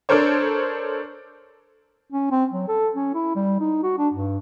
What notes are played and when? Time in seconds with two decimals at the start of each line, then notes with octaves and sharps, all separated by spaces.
0.09 D4 A4 A#4 C5 C#5
2.11 C#4
2.31 C4
2.52 F#3
2.68 A4
2.95 C#4
3.14 E4
3.35 G3
3.60 D#4
3.83 F#4
3.98 D4
4.13 G2